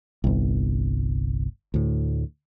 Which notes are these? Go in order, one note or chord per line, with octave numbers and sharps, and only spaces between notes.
G1 C2
D2 A2